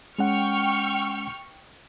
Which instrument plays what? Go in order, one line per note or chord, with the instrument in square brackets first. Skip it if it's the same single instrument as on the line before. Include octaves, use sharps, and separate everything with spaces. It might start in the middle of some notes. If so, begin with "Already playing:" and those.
[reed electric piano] G#3 C#4 F#5 [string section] G5 C#6 F6